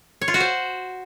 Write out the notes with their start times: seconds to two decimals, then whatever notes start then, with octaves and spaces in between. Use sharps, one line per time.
0.22 C#5
0.28 F4
0.34 F#4
0.40 C5